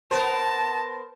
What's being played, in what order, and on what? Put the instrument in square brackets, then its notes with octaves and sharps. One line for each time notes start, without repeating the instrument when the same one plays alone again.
[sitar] B3 A#4 C5 [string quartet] A5